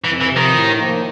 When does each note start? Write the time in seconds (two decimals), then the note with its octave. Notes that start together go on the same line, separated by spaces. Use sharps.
0.04 F2 E3
0.21 E3
0.28 C3 F3
0.36 D#3
0.53 A2
0.77 F3 A#3 D#4